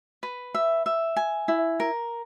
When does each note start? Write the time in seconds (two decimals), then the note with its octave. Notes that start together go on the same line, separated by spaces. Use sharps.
0.23 B4
0.54 E5
0.86 E5
1.16 G#5
1.48 E4
1.80 A#4